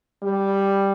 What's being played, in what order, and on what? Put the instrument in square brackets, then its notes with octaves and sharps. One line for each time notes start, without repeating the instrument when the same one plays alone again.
[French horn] G3